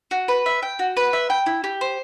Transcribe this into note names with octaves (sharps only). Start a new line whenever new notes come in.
F#4
B4
E5
G5
F#4
B4
E5
G5
E4
G4
C5